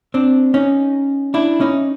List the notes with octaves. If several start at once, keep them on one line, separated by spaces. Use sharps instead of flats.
C4 D4
C#4 D#4
D4 E4
C#4 D#4